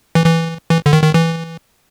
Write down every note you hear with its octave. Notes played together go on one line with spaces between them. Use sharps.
E3
E3
E3
D3
D#3
D#3
E3